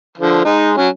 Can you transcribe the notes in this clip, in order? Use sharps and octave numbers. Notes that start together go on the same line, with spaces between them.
D3 F3
G#3 D#4
F#3 C#4